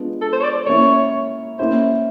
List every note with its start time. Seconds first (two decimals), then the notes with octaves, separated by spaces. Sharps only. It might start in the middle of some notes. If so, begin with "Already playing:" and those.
Already playing: G#3 B3 D4 F4
0.22 A4
0.33 C5
0.40 C#5
0.44 D5
0.67 A#3 C#4 E4 C#5
1.59 A#3 C#4 E4 C5